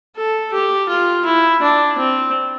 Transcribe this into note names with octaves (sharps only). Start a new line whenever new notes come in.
A4
G4
F4
E4
D4
C4